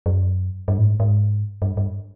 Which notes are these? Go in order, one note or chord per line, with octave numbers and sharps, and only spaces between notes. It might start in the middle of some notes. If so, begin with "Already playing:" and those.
F#2
G2
A2
G#2
G#2
G2
G2